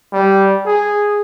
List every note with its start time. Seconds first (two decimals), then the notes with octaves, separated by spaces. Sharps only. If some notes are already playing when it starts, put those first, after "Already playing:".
0.13 G3
0.66 G#4